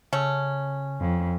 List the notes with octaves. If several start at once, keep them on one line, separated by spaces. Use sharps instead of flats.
C#3 A3 C#4
F2